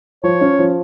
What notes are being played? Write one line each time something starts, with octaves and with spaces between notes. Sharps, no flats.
F3 C#5
C#4
F3